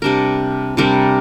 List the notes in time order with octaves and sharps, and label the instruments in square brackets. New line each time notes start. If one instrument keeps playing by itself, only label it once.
[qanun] C3 G3 D4 A#4
C3 G3 D4 A#4